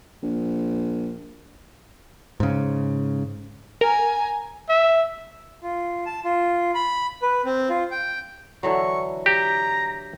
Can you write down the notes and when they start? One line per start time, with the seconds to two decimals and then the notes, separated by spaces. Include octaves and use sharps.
0.23 A#1
2.40 G#2 C#3
3.81 A#4 G#5 A#5
4.69 E5
5.61 F4
6.06 A5
6.24 F4
6.75 B5
7.22 B4
7.45 C4
7.69 F4
7.91 G5
8.63 D3 E3 F#3 C#6
9.26 G4 A#5